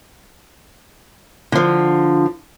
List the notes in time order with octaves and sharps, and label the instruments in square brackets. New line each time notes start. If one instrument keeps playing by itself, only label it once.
[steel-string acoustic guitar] D3 F3